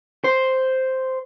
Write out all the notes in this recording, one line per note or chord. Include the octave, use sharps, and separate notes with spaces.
C5